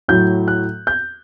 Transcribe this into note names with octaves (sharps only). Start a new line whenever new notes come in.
A2 F#3 G6
F#6
G6